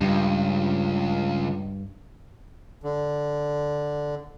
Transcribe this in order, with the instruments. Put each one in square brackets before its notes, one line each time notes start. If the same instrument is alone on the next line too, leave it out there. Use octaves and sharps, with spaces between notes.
[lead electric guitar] C#2 [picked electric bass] G2
[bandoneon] D3